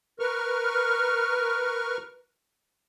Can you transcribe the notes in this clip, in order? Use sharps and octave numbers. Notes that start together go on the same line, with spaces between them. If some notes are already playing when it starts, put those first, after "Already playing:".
A#4 B4 C#6 F6